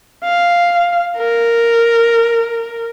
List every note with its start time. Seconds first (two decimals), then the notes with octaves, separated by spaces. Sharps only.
0.25 F5
1.18 A#4